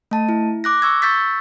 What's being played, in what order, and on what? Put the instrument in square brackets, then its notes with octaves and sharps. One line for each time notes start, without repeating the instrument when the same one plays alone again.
[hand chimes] A3 A5
E4
D6 F#6 A#6
C#6 E6 G#6
C#6 E6 G6 A6 B6